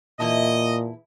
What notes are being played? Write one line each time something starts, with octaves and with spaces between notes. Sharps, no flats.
E2 A#2 E4 D#5 A5